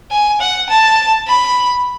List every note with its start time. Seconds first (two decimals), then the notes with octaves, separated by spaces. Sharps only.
0.11 G#5
0.40 F#5
0.69 A5
1.27 B5